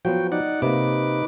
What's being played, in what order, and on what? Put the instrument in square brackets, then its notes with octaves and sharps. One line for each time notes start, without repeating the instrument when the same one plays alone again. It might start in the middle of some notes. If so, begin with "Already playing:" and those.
[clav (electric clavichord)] F3 F#3 B3 [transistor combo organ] F#4 G5
[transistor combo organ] D#4 D5 F#5
[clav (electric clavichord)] C3 A#3 [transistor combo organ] D#4 B4 D6